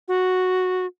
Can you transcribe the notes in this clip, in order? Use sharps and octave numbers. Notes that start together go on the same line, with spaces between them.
F#4